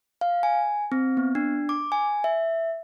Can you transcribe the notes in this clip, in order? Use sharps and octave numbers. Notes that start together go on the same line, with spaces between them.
F5
G#5
C4
B3
D4
D6
G#5
E5